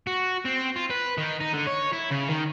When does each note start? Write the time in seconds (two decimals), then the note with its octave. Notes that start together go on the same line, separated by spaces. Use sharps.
0.07 F#4
0.45 C4
0.76 F4
0.90 B4
1.18 D#3
1.40 D#4
1.53 D3
1.67 C#5
1.92 E4
2.11 C#3
2.29 D#3